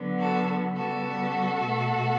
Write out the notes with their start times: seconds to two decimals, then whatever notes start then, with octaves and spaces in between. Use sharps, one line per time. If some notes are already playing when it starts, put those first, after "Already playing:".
Already playing: D3 F#3 B3
0.19 F#4 A4
0.76 C#3 G3 B3 F#4 A4
1.61 B2 A3